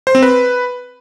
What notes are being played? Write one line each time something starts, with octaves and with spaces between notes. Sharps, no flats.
C5
C4
B4